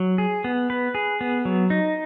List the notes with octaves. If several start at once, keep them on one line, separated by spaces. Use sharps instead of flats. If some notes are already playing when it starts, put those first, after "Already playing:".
Already playing: F#3
G#4
B3
B4
G#4
B3
F#3
D#4